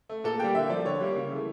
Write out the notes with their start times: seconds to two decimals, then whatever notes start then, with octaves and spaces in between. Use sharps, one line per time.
0.09 A3
0.24 A#2 A4
0.39 G3 A#3 G5
0.55 D3 E5
0.69 F3 A3 D5
0.85 D3 C#5
1.00 G3 A#3
1.16 C#3
1.31 E3 A3